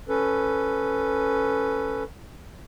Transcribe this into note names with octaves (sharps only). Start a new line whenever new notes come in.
C#4 A4 B4